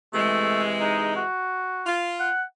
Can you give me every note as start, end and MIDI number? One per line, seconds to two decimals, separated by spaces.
0.14 1.21 48
0.14 1.21 52
0.14 1.21 56
0.14 0.64 57
0.81 1.14 63
1.16 1.86 66
1.84 2.27 65
2.20 2.43 78